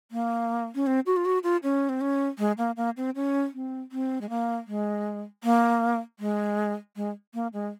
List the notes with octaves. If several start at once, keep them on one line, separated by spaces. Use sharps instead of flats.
A#3
C#4
C4
F#4
F4
F#4
F4
C#4
C4
C#4
G#3
A#3
A#3
C4
C#4
C4
C4
G#3
A#3
G#3
A#3
G#3
G#3
A#3
G#3